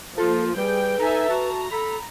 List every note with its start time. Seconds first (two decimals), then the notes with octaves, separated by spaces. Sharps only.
0.18 F3 A#3 F4 A4
0.56 G3 G#4 B4 G5 G6
0.99 D#4 A4 E5 G#5 A#5
1.29 F#4 A5 A#5
1.71 A4 B5